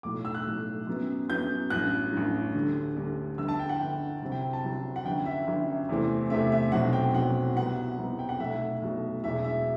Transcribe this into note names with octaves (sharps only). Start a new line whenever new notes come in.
B1 A2 F#3 D6
E6
F#6
B1 A2 F#3
F#2 F#3 B3
F#2 F#3 B3 G6
A1 G2 F#3 F#6
A1 G2 F#3
D2 D3 G3
D2 D3 G3
G1 G2 D3 E6
A5
G5
F#5
G1 G2 D3 G5
C2 C3 F#3 C4
G5
A5
C2 C3 F#3 C4
F#5
G1 F#2 F#3 G5
E5
G1 F#2 F#3
E2 C3 E3 A3 C4
E2 C3 E3 A3 C4 E5
E5
B1 B2 F#3 C4 F#5
G5
B1 B2 F#3 C4 F#5
C2 C3 F#3 B3 F#5
C2 C3 F#3 B3
G5
F#5
B1 B2 F#3 A3 E5
B1 B2 F#3 A3
E1 E2 B2 F#3 E5
E5